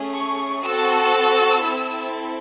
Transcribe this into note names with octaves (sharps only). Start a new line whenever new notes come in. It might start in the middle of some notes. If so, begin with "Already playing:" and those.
Already playing: A3 C#4 G#4
C#6
C4 F#4 A4 E6
C4 E4 A4